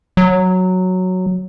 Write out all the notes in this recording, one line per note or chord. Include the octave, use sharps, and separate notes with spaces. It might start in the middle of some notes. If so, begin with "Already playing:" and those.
F#3